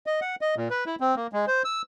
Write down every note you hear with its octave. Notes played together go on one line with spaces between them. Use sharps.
D#5
F#5
D#5
A#2
B4
E4
C4
A#3
G#3
C5
E6